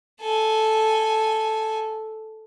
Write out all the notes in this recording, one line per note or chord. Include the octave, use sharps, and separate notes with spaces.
A4 G#5